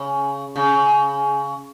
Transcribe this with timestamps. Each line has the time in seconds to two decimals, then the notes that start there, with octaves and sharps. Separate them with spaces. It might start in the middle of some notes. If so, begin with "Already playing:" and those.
Already playing: C#3
0.56 C#3